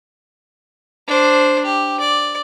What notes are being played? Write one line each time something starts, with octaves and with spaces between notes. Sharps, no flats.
D4 C5
G4
D5